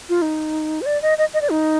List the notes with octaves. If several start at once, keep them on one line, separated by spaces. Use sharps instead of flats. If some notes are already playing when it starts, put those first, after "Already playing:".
F4
D#4
C5
D5
D#5
D#5
D#5
D5
D#4